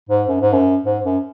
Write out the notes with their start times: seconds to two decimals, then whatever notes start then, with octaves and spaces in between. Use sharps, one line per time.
0.09 G#2
0.28 F#2
0.41 G#2
0.53 F#2
0.84 G#2
1.04 F#2